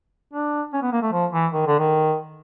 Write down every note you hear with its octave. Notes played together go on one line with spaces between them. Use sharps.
D4
C#4
B3
A#3
A3
F3
E3
D#3
D3
D#3